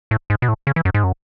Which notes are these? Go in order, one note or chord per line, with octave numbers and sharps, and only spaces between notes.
A2
G#2
B2
A2
C#3
E3
F#2
G#2
F#2